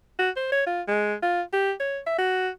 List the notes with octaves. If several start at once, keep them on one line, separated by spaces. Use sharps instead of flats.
F#4
C5
C#5
F4
G#3
F4
G4
C#5
E5
F#4